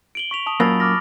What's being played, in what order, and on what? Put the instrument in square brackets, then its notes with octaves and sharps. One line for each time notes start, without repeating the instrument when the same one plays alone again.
[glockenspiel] D7 F#7 G7
C#6 B6 F7
A5 D#6 F7
[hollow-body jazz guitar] F#2 A#2 A#3 [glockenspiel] B5 E6 A6
[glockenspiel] D6 F6 A#6